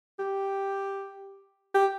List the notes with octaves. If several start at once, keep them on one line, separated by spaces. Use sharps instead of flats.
G4
G4